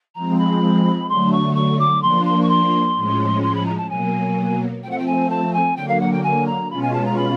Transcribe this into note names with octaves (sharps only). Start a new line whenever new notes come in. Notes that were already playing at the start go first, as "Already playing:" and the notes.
F3 G#3 C4 A#5
B5
D3 F#3 A3 C6
C#6
C#6
D6
F3 A#3 D4 C6
C6
C#6
C6
A2 F3 G#3 C#4
C6
B5
A#5
A5
B2 F#3 A#3 G#5
F3 A3 C4 G5
F#5
G5
G#5
A5
G#5
D3 F#3 A#3 G5
F5
F#5
G5
G#5
A#5
B2 G#3 C#4 F4 B5
G#5
A5
A#5
B5